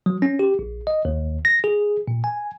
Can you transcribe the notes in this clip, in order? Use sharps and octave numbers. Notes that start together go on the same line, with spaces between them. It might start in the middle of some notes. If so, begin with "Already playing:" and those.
F#3
C#4
G4
A#1
D#5
D#2
A#6
G#4
A#2
G#5